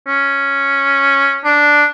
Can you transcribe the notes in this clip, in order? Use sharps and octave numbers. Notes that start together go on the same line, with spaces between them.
C#4
D4